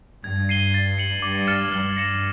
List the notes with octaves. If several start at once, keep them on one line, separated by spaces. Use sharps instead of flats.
G2 G#6
C7 D#7 G7
A6
C#7 F#7
G2 D6
F6 A6 C#7 E7
G2 F6
A#6 C#7 E7